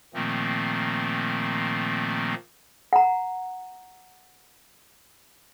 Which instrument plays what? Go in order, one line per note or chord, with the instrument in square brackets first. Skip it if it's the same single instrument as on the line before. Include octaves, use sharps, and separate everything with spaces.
[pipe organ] A#2 D#3 F3 A3 A#3 C4
[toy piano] F#5 A#5